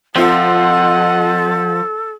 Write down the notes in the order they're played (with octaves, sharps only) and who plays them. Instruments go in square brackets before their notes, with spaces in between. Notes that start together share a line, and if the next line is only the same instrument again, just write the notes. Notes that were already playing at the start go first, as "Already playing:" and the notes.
[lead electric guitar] F3 [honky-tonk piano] C4 F4 [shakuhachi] A4 [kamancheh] D#5 F#5